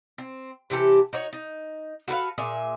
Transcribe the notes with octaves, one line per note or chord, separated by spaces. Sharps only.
C4
C3 E3 G4 A4
D#4 F#4 C#5
D#4
F#4 A4 B4 F5
A#2 G#4 E5